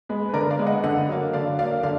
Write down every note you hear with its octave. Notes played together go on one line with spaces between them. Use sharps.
G#3 B3
B4
D3 A#4 D5
D5 F5
G#3 B3
D#5 F#5
D3 D#5 F#5
F#3 A#3
D3 D5 F5
F#3 A#3 D5 F5
D3 D5 F5